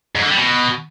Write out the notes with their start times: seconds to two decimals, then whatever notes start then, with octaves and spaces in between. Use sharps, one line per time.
0.16 G#2
0.23 D3
0.30 G3
0.38 B2